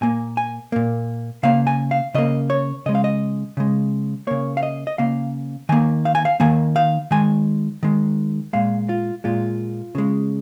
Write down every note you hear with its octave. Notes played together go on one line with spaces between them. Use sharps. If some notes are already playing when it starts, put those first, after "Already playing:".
A#2 A#3 G#5
G#5
A#2 A#3
C#3 A#3 F5
G#5
F5
C#3 A#3 D#5
C#5
C#3 G#3 D#5
F5
D#5
C#3 G#3
C#3 A#3 C#5
F5
D#5
D#5
C#3 A#3 F5
D#3 A#3 G#5
F5
G#5
F5
D#3 A#3 G#5
F5
D#3 G#3 G#5
D#3 G#3
A#2 G#3 F5
F4
A#2 G#3 F4
C#3 G#3